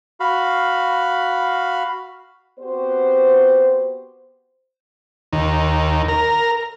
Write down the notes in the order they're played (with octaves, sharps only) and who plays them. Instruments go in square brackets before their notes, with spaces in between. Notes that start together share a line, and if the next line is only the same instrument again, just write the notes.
[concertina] F#4 F5 B5
[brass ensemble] B3 C4 F#4 G4 C5
[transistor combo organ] D#2
A#4